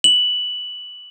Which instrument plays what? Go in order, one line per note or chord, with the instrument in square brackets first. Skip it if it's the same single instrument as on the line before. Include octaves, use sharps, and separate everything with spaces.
[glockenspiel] F#7